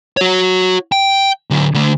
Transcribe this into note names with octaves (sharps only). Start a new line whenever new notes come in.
F#4 C#5
G5
D3 F#3
D3 A3